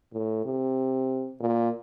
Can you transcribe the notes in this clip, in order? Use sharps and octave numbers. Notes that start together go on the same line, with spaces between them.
A2
C3
A#2